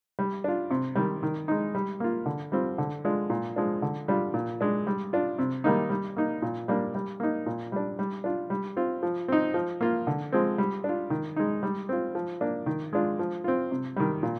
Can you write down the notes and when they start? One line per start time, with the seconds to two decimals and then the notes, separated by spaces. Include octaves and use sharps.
0.19 G3
0.44 D4 F4
0.71 C3
0.96 D#3 G3
1.23 D#3
1.48 G#3 D#4
1.75 G3
2.00 A#3 F4
2.26 D3
2.52 G3 C4 F4
2.78 D3
3.04 G#3 D4 F4
3.30 A#2
3.56 F3 G#3 D4
3.82 D3
4.08 G3 D4 F4
4.34 A#2
4.61 G#3 D4
4.87 G3
5.13 D4 F4
5.39 C3
5.64 D#3 G3 A#3 D#4
5.90 G3
6.17 A#3 D#4
6.42 A#2
6.68 G3 A#3 D4
6.95 G3
7.20 A#3 D#4
7.46 A#2
7.72 G3 D4
7.99 G3
8.24 D4 F4
8.50 G3
8.77 C4 F4
9.03 F3
9.28 C4 D#4
9.54 F3
9.81 A#3 F4
10.07 D3
10.32 F3 G#3 C4
10.58 G3
10.84 D4 F4
11.10 D#3
11.36 G#3 D#4
11.63 G3
11.89 C4 F4
12.15 F3
12.41 A#3 D4
12.66 D#3
12.93 G#3 D4 F4
13.19 F3
13.44 C4 F4
13.71 C3
13.97 D#3 G3
14.23 A#2